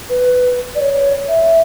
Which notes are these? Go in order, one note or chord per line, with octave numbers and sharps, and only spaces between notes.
B4
D5
C#5
E5